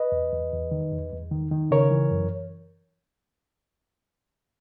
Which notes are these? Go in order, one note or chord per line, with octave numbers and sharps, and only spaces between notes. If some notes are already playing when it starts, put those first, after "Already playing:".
Already playing: B4 D#5
E2
E2
E2
D#3
E2
E2
D#3
D#3
C#3 A#4 C#5
E3
F#2